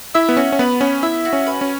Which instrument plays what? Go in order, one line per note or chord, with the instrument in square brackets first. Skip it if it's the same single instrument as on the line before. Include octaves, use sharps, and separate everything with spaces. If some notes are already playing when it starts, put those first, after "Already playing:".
[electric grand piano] E4 [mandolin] E5
[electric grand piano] B3
[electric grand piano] C#4 [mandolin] F#4
[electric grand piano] C#4
[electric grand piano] B3 [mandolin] B4
[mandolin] B3 [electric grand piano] C#4
[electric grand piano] E4 [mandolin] E5
[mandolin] F#4
[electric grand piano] C#4
[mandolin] B4
[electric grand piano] C#4